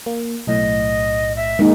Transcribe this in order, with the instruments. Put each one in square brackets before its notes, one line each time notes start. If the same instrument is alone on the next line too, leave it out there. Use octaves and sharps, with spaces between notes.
[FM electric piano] A#3
[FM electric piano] B1 A2 [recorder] D#5
[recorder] E5
[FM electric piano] D#3 [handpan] G#3 A#3 D#4